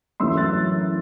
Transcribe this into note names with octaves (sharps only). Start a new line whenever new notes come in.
F#2 E3 A3 E4 C6 E6
F#6 A6